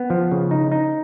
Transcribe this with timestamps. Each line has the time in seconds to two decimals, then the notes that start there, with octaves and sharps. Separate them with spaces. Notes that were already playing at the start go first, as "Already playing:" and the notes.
Already playing: B3
0.10 F3
0.31 C#3
0.51 D#4
0.72 D#4